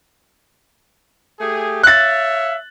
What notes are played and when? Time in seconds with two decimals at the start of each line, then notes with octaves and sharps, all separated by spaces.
1.39 A3 G4 G#4
1.83 C#5 E5 F5 F#6 A6